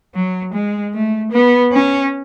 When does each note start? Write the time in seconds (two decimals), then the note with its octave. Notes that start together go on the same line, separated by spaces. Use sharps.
0.15 F#3
0.54 G#3
0.94 A3
1.32 B3
1.73 C#4